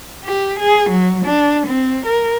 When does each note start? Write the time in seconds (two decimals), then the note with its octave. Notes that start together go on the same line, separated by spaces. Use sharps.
0.25 G4
0.60 G#4
0.90 F#3
1.25 D4
1.67 C4
2.06 A#4